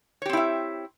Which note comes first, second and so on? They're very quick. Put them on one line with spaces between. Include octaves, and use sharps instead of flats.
C#5 G4 C4 E4 E5